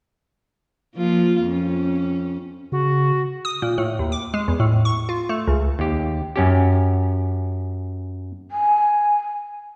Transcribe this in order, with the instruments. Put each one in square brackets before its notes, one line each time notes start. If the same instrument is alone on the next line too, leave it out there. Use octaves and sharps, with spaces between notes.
[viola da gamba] F3 A#3 F4
F2 C#4
[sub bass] C#3 [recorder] F#4
[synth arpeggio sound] D#6
A#2
A2
D#2
D6
G#3
E2
A2
C#6
F4
A3
C#2
[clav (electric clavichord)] D#2 G4
F#2 C#4 G4
[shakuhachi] G#5